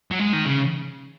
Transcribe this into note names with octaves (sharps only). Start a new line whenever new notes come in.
F#3
G#3
D#3
C#3